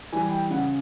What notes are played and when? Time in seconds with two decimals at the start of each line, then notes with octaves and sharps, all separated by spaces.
0.12 E3 G3 G#5
0.32 G5
0.51 C#3 F#5